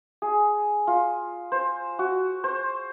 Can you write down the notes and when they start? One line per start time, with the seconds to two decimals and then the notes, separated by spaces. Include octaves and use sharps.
0.22 G#4
0.87 F4
1.52 C5
1.99 F#4
2.44 C5